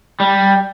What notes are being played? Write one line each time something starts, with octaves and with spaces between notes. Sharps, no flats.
G3